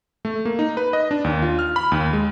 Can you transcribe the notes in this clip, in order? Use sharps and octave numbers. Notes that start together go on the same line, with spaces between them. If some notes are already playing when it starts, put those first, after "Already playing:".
A3
A#3
D#4
B4
D#5
D4
D#2
F4
F6
B5
D#2
G#3